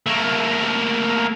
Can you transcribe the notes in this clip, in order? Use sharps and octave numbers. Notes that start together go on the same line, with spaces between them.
A3 A#3